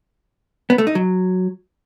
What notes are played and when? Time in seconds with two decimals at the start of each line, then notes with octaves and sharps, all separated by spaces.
0.70 B3
0.78 A3
0.87 D#4
0.95 F#3